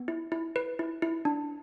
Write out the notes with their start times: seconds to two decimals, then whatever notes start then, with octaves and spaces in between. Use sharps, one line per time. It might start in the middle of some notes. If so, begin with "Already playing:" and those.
Already playing: B3
0.08 E4
0.32 E4
0.56 B4
0.79 E4
1.02 E4
1.25 D4